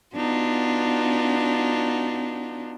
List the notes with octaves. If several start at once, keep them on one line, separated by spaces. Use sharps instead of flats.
B3 D4 D#4 F4 F#4